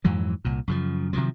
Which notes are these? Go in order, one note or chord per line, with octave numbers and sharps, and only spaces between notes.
F2 G#2 E3 F#3
C2 A#2
F#2 C#3 F3
C3 D#3 F3 F#3